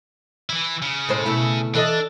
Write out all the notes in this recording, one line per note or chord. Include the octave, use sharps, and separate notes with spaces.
E3 E4
C#3
A2 G#3 C5
B2 A3 E4
E3 D4 A4 D#5